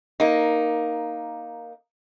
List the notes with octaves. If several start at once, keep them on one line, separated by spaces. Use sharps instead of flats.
A#3 D#4